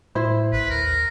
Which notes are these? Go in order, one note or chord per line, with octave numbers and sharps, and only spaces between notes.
A2 E4 C5
A1 B4
D#2 A#4